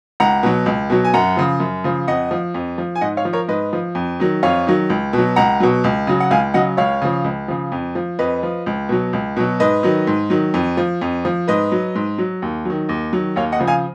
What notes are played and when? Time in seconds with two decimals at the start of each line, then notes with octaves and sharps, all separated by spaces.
0.20 C#2 F#5 A#5
0.43 B2 F#3
0.66 C#2
0.90 B2 F#3
1.05 G#5
1.14 F#2 F#5 A#5
1.37 C#3 F3
1.60 F#2
1.84 C#3 F3
2.08 F2 D#5 F#5
2.31 F3
2.54 F2
2.78 F3
2.95 G#5
3.01 G#2 D#5 F#5
3.17 C#5 F5
3.25 F3
3.33 A#4 C#5
3.48 G#2 B4 D#5
3.73 F3
3.95 F2
4.20 D#3 F#3
4.43 F2 C#5 F5
4.67 D#3 F#3
4.90 C#2
5.13 B2
5.18 F#3
5.36 C#2 F#5 A#5
5.60 B2 F#3
5.84 C#2
6.07 C#3 F#3
6.20 F#5
6.31 C#2 F5 G#5
6.54 C#3 F#3 D#5 F#5
6.77 C#2 C#5 F5
7.02 C#3 F3
7.24 C#2
7.48 C#3 F3
7.72 F2
7.95 F3
8.19 F2 B4 D#5
8.43 F3
8.66 C#2
8.89 B2 F#3
9.13 C#2
9.36 B2 F#3
9.60 G#2 B4 D#5
9.83 D#3 F#3
10.07 G#2
10.30 D#3 F#3
10.54 F2
10.77 F3
11.02 F2
11.25 F3
11.48 G#2 B4 D#5
11.72 F#3
11.95 G#2
12.18 F#3
12.42 D#2
12.65 D#3 F#3
12.89 D#2
13.13 D#3 F#3
13.36 D#2 C#5 F5
13.52 D#5 F#5
13.60 C#3 F3
13.67 F5 G#5